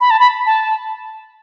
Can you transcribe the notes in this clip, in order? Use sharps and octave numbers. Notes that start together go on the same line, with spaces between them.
B5
A5
B5
A5